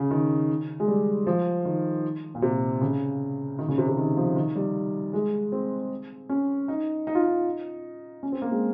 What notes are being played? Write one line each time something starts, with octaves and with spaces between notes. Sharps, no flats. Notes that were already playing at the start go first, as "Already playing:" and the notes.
Already playing: C#3
D#3
G#3
G3
F3
D#3
A#2
C3
C#3
D#3
C#3
C3
C3
D#3
F3
D#3
G3
G#3
C4
C#4
D#4
D#4
F4
D#4
C#4
C4
A#3
G#3